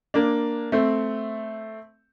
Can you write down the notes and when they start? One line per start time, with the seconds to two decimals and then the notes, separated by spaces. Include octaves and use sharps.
0.14 A#3 D4
0.72 A3 C4